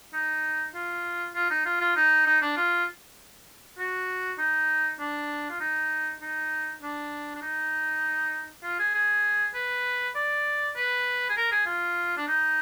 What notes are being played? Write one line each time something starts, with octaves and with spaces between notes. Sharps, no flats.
D#4
F4
F4
D#4
F4
F4
D#4
D#4
D4
F4
F#4
D#4
D4
F4
D#4
D#4
D4
D4
D#4
F4
G#4
G#4
B4
D5
B4
G#4
A#4
G#4
F4
D4
D#4